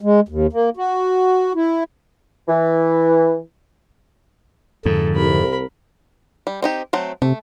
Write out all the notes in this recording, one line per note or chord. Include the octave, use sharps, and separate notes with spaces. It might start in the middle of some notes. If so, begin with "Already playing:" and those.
G#3
D#2
A#3
F#4
E4
E3
F2 G#2 D3 A4
C2 A#4 B5
G3
C4 D#4 G4
F#3 A3 C4
C3 A3